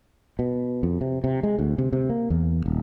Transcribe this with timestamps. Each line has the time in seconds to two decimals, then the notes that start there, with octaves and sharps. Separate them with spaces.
0.39 B2
0.83 F2
1.01 C3
1.24 C3
1.43 G#3
1.59 D2
1.78 C3
1.93 C3
2.10 A#3
2.30 E2
2.66 D#1